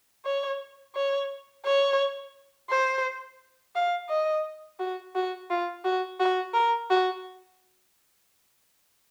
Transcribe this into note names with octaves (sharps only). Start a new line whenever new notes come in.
C#5
C#5
C#5
C5
F5
D#5
F#4
F#4
F4
F#4
F#4
A#4
F#4